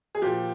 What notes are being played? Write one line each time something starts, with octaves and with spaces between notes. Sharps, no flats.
G#4
A#2 F3 G4